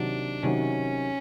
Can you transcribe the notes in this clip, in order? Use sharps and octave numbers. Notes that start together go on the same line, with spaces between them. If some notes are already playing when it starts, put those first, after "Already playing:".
Already playing: C3 D#3 F#3 D4
C3 D#3 F#3 C#4